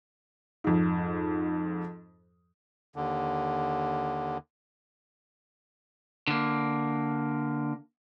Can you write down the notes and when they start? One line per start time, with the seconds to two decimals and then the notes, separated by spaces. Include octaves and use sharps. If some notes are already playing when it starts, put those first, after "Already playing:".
0.64 F2 G#2
2.96 D#2 D3
6.28 D3 A#3